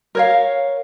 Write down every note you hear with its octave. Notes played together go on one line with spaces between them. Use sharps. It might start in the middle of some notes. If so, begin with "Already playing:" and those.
A#4 C#5 F5